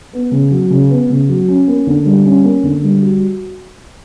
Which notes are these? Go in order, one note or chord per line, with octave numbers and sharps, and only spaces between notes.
B3
C#3
F#3
C#3
B3
C#3
F#3
C#4
A#3
D3
G3
C#4
A#3
D3
G3
F#4